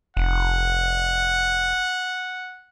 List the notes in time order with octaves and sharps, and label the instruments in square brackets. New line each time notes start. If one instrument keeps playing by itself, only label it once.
[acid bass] F1 [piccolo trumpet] F#5